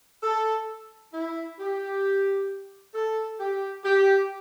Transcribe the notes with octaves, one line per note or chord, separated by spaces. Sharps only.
A4
E4
G4
A4
G4
G4